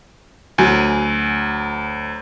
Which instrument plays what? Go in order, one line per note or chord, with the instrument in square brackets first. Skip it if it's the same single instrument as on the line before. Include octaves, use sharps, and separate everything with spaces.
[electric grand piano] D2 [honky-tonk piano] F#3 G#5